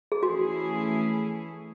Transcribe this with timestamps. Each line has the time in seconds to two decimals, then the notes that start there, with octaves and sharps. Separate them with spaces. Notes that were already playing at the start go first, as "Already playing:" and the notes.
0.12 G#4
0.23 E3 A3 C#4 E4 F#4 G#4